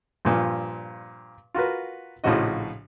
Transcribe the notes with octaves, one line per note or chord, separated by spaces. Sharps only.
G2 A#2 F3
F4 F#4 A#4 B4
A#1 A2 C#3 F3 F#4 D#5